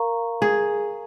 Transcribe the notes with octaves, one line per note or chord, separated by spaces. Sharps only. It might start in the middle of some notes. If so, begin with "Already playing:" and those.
Already playing: A#4 F5 A#5 C#6
G#4